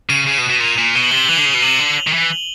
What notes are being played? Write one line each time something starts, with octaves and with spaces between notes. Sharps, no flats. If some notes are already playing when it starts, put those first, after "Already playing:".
C#3 D#7
C#3 E7
B2
B2
A#2 F7
A#2
B2 G7
F#7
C3 G7
F#7
E3 F7
D3
C#3
B2
C3 F#7
D3
D#3
E3
F#7